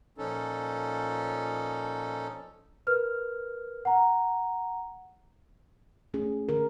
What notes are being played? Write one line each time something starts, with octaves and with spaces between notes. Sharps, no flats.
A#2 F3 C#4 D#4 A4
A#4 B4 F6
F#5 A#5
A3 C#4 G#4
D3 A#4